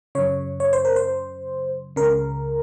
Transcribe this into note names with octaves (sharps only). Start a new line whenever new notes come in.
F#2 C#3 C#5
C#5
C5
A#4
C5
C#2 C#3 A#4